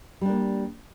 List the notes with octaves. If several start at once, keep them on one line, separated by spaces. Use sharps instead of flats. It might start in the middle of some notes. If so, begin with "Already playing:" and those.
G3 A#3 D4